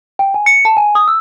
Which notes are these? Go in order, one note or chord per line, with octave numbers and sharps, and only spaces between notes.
G5
G#5
C#7
A5
G#5
D#6
E6